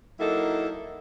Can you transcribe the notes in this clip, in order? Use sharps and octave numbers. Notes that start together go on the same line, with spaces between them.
F#3 A#3 D#4 E4 A4